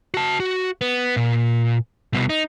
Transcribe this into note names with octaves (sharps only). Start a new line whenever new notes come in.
F#4 A5
F#4
B3
A#2
C2 B2
D#4